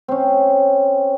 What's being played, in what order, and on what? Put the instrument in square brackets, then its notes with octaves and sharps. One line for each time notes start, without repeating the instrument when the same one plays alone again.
[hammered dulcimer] C4 C#4